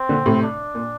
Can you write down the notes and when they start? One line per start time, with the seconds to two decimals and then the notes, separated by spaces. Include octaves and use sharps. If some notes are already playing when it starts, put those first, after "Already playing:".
Already playing: C4
0.09 A#2 D3
0.26 A2 C3
0.42 D4
0.75 A#2